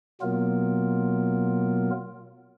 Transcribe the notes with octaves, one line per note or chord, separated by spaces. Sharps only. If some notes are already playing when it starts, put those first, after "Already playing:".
B2 F#3 A#3 B3 F4 A#4